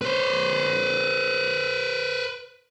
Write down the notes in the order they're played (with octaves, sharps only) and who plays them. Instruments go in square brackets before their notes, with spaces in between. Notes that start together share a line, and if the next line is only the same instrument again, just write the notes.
[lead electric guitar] B4 C5